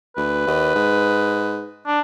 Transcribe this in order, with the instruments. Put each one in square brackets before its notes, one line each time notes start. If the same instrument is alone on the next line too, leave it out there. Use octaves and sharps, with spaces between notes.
[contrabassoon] D2 [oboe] B4
[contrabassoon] D#2
G#2
[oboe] D4